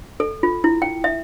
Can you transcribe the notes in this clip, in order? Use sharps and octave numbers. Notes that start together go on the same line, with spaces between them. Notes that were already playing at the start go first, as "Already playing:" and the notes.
A4
F4
E4
G5
E5